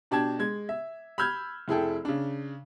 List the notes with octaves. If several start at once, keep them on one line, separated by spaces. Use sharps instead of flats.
B2 D4 G4 A5 G#6
G#3 G#6
E5
B5 E6 F6 G6 G#6
F1 E4 G#4 A4 G5
C#3 D4